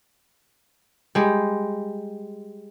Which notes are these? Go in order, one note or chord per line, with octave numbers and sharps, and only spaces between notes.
G3 G#3